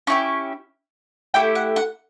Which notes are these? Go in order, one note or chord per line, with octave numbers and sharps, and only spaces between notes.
C#4 E4 G4 C#6
A3 E4 G4 G5
F#5
F#5